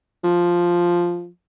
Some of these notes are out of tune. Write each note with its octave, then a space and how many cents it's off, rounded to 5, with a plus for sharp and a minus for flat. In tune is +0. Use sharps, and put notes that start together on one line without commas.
F3 +0